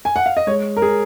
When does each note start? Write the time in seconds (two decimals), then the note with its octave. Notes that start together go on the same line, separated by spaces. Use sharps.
0.05 G#5
0.16 F#5
0.26 F5
0.37 D#5
0.47 G#3 C#5
0.77 A#4
0.82 G#3 G#4